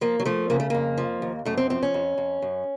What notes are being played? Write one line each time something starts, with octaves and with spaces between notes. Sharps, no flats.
F3 A#3
F#3
F3 A3
C#3 A#3
A3
F2 A#3
F3
D#2
F#2 A3
C4
F3 C4
C#4
F2
F2
F#2